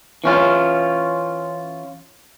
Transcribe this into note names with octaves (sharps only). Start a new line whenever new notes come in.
E3 C#4 F4